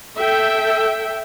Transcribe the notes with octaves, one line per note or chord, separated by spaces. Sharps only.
A4 E5 G5